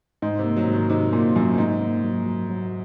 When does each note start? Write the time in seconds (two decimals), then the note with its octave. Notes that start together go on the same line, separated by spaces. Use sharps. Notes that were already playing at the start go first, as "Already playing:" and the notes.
0.22 G#2 D#4
0.39 C3
0.44 A#3
0.56 F#3
0.68 G#2
0.73 D#3
0.90 C3 D#4
1.13 A#2 A#3
1.36 F#2 F#3
1.58 G#2 D#4
1.81 A#3
2.03 F#3
2.26 F#3
2.49 F#3